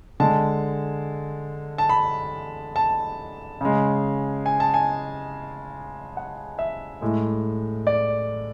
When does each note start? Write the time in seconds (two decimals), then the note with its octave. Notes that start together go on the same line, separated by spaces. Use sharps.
0.20 D3 G#3 A5
1.78 A5
1.89 B5
2.76 A5
3.61 C#3 G#3
4.46 G#5
4.60 A5
4.74 G#5
6.17 F#5
6.59 E5
7.01 A2 G#3
7.87 D5